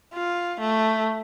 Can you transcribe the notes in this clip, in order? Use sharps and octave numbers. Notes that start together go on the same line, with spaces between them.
F4
A3